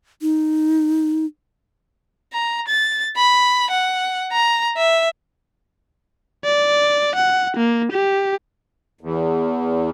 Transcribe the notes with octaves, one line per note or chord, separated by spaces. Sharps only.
D#4
A#5
A6
B5
F#5
A#5
E5
D5
F#5
A#3
G4
E2